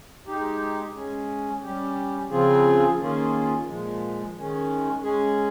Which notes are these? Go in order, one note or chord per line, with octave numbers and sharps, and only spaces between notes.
G#3 D#4 G4
G#3 C#4 G#4
G3 C#4 G4
C#3 F3 C4 F4 G#4
D#3 A#3 C#4 F4 G#4
A#2 F3 G#3
D#3 G#3 C#4
G#3 C#4 G#4